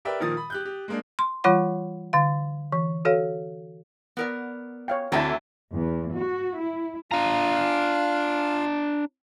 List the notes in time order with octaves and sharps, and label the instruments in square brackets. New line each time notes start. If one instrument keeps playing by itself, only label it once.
[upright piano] G4 A#4 B4 D5 E5 G5
A#2 D#3 F3 A#4 D#6 A6
B5
G4 F#6 G6
G4
G#3 A#3 D4
[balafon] C6
E3 G3 F4 C#5 F#5 B5
D3 F5
E3
F#4 A4 C#5 F5
[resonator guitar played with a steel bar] B3 A#4 D5
[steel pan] C#5 F5 G5
[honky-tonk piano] D2 E4 [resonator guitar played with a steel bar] D3 C4 A4 [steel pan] A5 A#5
[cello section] E2
F#4
E4
[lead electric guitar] D4 A#5 [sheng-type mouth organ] F4 F5